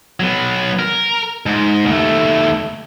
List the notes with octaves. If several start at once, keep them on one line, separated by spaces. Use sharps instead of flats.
F#3 B3
A#4
G#2
D#2 A3